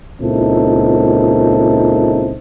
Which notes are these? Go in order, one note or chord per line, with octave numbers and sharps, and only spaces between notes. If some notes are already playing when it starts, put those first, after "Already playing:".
C#2 A#2 C4 D#4 E4 A4